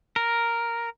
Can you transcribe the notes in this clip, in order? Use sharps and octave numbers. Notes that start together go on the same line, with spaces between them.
A#4